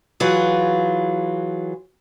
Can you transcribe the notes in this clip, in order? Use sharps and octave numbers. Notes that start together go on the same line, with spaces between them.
E3 F#3 F4 G#4